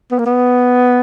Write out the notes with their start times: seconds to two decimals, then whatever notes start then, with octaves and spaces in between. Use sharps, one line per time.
0.12 B3
0.19 A#3
0.26 B3